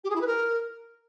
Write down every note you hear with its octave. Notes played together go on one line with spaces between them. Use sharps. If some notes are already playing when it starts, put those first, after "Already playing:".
G4
G#4
E4
B4
A#4